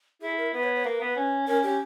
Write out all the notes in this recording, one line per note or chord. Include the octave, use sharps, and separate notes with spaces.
E4 G#4
A#4
B3 B4
C#5
C#5
A#3 B4
B3
C#4
C#4 A#4
C#4 G4